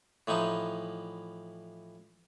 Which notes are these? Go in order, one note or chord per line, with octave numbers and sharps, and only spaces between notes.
A2 E3 F3 D#4